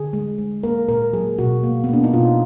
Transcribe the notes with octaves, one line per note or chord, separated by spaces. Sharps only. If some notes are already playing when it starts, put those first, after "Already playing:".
Already playing: D3 G#4
G#3
G#3
A#3 A#4
A#2 A#4
F#3 G#4
B2 F#4
A#3
B3
A#3 D4
D#4
B2 F4